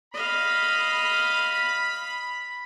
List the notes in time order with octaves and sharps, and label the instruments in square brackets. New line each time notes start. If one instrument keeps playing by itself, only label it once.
[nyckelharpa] D#5 F5 [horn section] B5